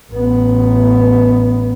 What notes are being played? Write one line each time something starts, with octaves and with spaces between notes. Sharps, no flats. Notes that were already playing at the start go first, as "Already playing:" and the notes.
A1 B3